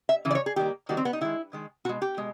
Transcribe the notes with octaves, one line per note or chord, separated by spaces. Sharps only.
E5
C#3 E3
D5
C#5
G#4
D#3 G3 A#3 G4
D#3 G3 A#3 F#4
C4
B3
D#4
D#3 G#3 E4
D#3 G#3
B2 G#3 F#4
G4
B2 G#3